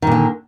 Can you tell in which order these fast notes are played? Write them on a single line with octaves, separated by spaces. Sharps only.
D#3 A#2 D3